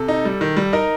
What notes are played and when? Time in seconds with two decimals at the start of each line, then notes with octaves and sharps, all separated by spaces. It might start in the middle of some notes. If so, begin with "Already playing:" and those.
Already playing: C3 A4
0.08 D#4
0.25 G3
0.41 D#3
0.57 G3
0.73 D#4 A#4